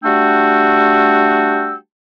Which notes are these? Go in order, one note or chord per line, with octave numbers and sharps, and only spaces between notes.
G3 A3 D4 F#4 G5 E6